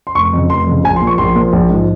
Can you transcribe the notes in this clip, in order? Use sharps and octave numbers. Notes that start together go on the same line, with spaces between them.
C6
F1 C#6
F2 C#3
F1 C6
F2 C#3
A#1 G#5
C6
A#2 F3
C#6
A#1 C6
A#2 F3
A#1
G#2
F3